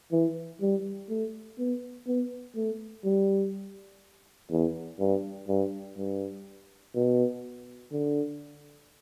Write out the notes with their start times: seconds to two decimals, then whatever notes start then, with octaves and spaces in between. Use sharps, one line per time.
0.12 E3
0.61 G3
1.09 A3
1.58 B3
2.07 B3
2.56 A3
3.04 G3
4.51 E2
4.99 G2
5.48 G2
5.97 G2
6.94 B2
7.92 D3